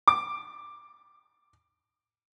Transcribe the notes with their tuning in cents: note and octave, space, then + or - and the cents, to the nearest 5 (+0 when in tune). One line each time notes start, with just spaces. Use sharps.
D6 +5